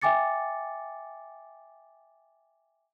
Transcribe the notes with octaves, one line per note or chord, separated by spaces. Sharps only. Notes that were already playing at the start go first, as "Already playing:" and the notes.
E5 G5 G#5 D6 A6 C#7